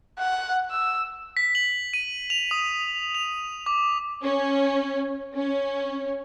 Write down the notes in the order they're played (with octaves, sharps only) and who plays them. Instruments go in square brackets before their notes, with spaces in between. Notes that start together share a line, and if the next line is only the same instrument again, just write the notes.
[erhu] F#5
E6
[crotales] B6
F#7
D#7
F7
D#6
F7
D6
[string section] C#4
C#4